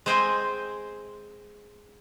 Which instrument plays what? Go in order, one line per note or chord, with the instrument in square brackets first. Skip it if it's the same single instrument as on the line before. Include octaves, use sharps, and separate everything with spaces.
[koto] G#3 C4 C5 D#5 G5 G#5